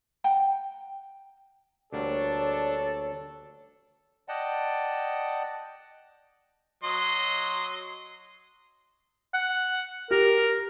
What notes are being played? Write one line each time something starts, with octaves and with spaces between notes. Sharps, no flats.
F#5 G5 A#5
D2 G3 A#3 D4 A4 C#5
D5 D#5 F#5 G5 A5
F#3 D#5 C6
F#5
G4 A#4